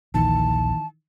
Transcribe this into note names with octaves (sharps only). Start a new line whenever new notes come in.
A#1 D#2 D#3 E3 A5